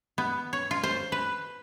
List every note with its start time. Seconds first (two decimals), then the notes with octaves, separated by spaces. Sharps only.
0.18 B3
0.53 C#5
0.71 F4
0.83 C5
1.12 B4